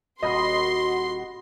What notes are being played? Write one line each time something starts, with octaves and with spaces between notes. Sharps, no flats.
D#1 F#4 D#5 B5 C6